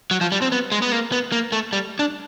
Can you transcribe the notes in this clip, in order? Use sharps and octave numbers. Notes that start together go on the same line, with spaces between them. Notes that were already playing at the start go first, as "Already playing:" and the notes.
F#3
F3
G3
C4
B3
G#3
B3
A#3
B3
A#3
A3
G3
D4